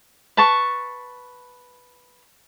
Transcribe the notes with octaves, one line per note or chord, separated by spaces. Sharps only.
B4 A5 C#6